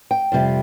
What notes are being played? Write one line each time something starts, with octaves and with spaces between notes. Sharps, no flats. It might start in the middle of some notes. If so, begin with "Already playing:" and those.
G5
F2 C3 G3